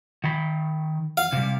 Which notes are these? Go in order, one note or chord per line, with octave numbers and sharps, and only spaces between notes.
D#3 B5
F5
C3 G3